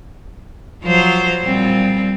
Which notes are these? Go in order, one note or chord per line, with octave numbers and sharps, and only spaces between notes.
F3 F#3 C5
A#2 G3 C4